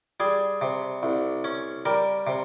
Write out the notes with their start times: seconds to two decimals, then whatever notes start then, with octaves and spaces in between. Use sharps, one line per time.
0.20 G3 G#4
0.62 C3
1.03 C2
1.44 C#4
1.85 G3 A#4
2.27 C3